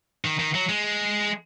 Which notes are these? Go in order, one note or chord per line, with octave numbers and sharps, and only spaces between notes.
D#3
D#3
F#3
G#3